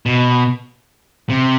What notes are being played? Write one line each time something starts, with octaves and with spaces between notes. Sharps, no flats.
B2
C3